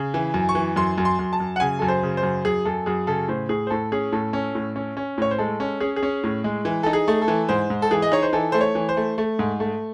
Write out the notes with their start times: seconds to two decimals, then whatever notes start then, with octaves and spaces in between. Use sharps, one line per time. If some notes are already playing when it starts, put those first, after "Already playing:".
Already playing: C#3
0.14 E3
0.34 F#2
0.49 C#6
0.55 E3
0.76 F#2 C6
0.98 F#2
1.05 C6
1.19 F#2
1.33 A5
1.40 F#2
1.56 F#5
1.60 C#3 G#5
1.79 F#2 A4
1.88 C5
2.03 C#3
2.17 C5
2.23 F#2
2.45 F#2 G#4
2.65 F#2 A4
2.86 F#2 G#4
3.07 C#3 A4
3.28 A2 C5
3.49 A2 G#4
3.67 C5
3.70 A2 A4
3.92 C#4 G#4
4.12 A2 A4
4.33 C#4
4.55 A2
4.76 C#4
4.97 C#4
5.18 A2 C#5
5.31 C5
5.38 G#3 A4
5.60 C#4
5.80 C#4 G#4
5.96 G#4
6.03 C#4
6.24 A2
6.44 G#3
6.65 E3
6.83 D#4 A4
6.93 G#4
7.08 A3
7.22 A4
7.28 E3
7.49 G#2 C5
7.70 G#2
7.82 A4
7.91 E3 G#4
8.02 D#5
8.12 D#4 C#5
8.23 C5
8.33 E3 A4
8.52 A3 C5
8.61 C#5
8.75 E3
8.89 C5
8.97 A3
9.18 A3
9.39 G#2
9.60 A3